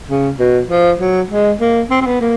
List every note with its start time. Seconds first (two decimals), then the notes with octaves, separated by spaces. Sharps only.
0.09 C#3
0.39 B2
0.70 F3
1.00 F#3
1.30 G#3
1.60 A#3
1.91 C4
2.01 C4
2.06 B3
2.21 A#3